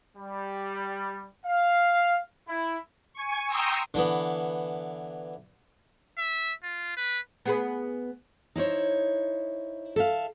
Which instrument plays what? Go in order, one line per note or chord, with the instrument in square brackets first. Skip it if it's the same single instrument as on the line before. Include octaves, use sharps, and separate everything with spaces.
[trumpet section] G3
F5
E4
[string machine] G#5 C#6
G5 A#5 C6 C#6 D#6 E6
[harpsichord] D3 E3 B3
[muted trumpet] E5
F4
B4
[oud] B3 G#4 B4
[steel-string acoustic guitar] D#4 E4 C5 C#5
A4 E5 F5